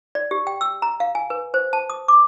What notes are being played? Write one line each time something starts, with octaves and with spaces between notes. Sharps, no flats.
D5
G4
G5
E6
A#5
F5
G#5
B4
C5
A5
D#6
D6